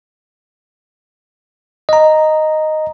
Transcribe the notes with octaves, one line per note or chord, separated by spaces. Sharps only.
D#5 A#5